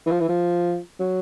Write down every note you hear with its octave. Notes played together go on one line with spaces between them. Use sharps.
E3
F3
E3
F3
F#3